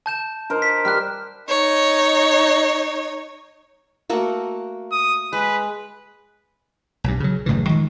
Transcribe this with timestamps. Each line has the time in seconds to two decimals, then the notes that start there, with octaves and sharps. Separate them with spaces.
0.06 A5 G6 E7
0.50 D#4 A#4 C5
0.62 B6
0.85 G3 G4 F6 F#6
1.49 D#4 C#5
4.10 A3 A#3 F#4
4.92 D#6
5.33 G#3 B4
7.04 B1 G2
7.20 C#3 F#3
7.46 F#1 A2 C#3 E3
7.66 D#3 F3 G#3